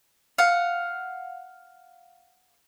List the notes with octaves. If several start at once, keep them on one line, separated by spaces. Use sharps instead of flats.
F5 F#5